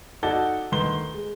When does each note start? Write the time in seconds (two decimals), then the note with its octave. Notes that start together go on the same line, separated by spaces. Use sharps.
0.23 D#4 F#4 A4 D5 A6 G7
0.72 D2 D#3 B4 C6 G7
1.14 G#3